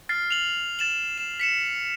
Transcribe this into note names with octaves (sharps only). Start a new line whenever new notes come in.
F6 A6 C7
F7 F#7
A6 E7 F#7
E7
B6 C#7 E7